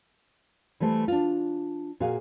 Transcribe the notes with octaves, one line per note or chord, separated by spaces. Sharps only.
E3 G3 A3 C5
D4 F4
A#2 F#4 G#4 F5 G#5